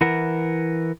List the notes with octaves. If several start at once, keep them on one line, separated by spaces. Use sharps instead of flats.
E3 E4 A#4 F#5